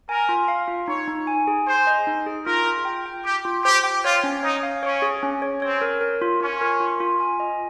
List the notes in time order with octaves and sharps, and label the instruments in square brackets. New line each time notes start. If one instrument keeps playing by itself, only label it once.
[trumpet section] A#4 [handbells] G#5
[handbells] F4
F5
F4
[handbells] D#4 [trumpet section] C#5
[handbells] D#4
G#5
G#4
[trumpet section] C5 [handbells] G#5
[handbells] D#5
D#4
G#4
[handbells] F4 [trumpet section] A#4
[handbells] F4
G5
G5
[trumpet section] G4 [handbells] G5
[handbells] F4
[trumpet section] G4 [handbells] C5
[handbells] G5
[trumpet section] F4 [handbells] C#5
[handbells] C#4
[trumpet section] D#4 [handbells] C#5
[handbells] F5
[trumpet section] C#4 [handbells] C#5
[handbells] G#4
C#4
C#5
[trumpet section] C4 [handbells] C#5
[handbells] A#4
A#4
F4
[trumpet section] C#4 [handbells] F4
[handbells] A#4
F4
F4
G#5
D#5